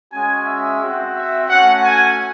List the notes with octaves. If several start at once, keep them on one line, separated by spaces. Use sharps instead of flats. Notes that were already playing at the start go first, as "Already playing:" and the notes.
G#3 C#4 F#4 G#5
E5
C4 F#4
E5
A3 C#4 F#4 F#5
G#5